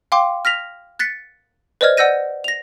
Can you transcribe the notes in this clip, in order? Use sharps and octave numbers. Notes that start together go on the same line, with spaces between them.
F5 G5 C6 D6
F6 A#6 B6 F7
F#6 A6 B6 C#7
B4 C5 D5 D#5 F6 G#6
D5 F#5 E6 G6 A#6 D#7
A#6 F7